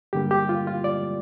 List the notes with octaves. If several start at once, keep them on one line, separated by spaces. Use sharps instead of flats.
G2 D3 G3 A#3 G4
G4
F4
F4
D5